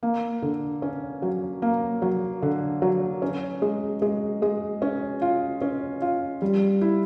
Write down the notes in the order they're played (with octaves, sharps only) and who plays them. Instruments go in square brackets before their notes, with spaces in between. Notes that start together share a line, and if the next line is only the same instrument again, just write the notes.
[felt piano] A#3
D3
C#4
F#3
A#3
F#3
D3
F#3
C#4
G#3
G#3
G#3
C#4
F4
C#4
F4
G3
E4